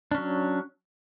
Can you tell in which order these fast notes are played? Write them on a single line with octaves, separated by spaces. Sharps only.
D4 C#4 F#3